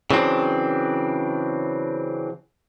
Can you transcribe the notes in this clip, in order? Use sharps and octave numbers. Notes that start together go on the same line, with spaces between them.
C#3 E3 F#3 C4 D4